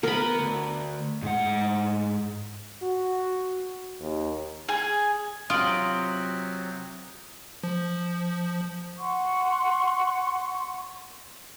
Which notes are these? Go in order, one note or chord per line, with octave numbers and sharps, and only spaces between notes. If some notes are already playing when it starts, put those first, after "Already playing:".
B3 A#4 B5
D2
G#2 F#5
F#4
D#2
G#4
C3 F#3 F4 D#6 D7 F#7
F3
F#5 C6 C#6